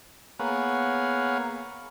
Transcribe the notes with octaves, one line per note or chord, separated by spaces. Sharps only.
A#3 B3 G#4 C#5 F5 F#5